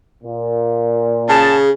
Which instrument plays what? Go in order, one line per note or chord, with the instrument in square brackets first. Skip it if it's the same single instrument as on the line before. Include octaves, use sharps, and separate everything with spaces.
[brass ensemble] A#2
[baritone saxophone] C#3 [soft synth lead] G#4 [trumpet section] A5